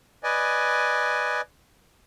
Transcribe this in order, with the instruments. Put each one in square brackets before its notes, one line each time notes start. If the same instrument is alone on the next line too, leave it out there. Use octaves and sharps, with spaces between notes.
[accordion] B4 D5 D#5 G#5